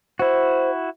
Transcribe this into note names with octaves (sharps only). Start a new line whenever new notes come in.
E4 F#4 C5